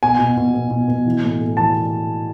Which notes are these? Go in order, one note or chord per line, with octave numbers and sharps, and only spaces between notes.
B2 G#5
B2
B2
B2
B2
B2
E3
A2
A2
E3 A5